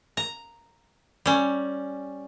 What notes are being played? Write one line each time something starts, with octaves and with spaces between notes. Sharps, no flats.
A#5
G3 C#4